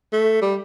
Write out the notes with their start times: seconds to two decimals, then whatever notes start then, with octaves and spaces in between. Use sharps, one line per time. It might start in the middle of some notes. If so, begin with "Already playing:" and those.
0.12 A3
0.42 G3